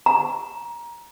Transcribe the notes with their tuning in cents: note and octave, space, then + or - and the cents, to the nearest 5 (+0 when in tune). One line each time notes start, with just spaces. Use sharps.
A#5 +20